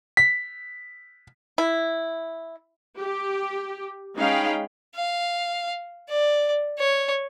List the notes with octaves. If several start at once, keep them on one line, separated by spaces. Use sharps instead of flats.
B6
E4
G4
G#3 C#4 D#4 F5 G5 B5
F5
D5
C#5